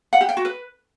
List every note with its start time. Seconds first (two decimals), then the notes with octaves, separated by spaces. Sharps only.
0.13 F#5
0.21 G4
0.29 G5
0.37 F#4
0.45 B4